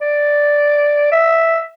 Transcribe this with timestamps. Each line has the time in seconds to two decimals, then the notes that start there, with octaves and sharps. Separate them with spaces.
0.01 D5
1.12 E5